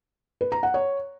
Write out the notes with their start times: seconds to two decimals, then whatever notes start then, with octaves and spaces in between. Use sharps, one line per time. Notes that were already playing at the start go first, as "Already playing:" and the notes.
0.41 B4
0.52 A#5
0.63 F#5
0.74 C#5